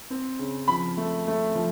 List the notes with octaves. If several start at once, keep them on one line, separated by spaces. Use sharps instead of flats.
C4
C#3
F3 B5
A3
A3
F3